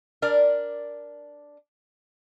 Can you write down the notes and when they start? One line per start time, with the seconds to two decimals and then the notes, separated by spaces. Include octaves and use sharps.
0.22 D4 A#4 D5